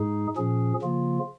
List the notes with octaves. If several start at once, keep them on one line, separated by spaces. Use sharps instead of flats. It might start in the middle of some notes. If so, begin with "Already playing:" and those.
Already playing: G#2 G#3 D#4 G#4
A#2 F3 C#4 G#4
C#3 F3 A#3 F4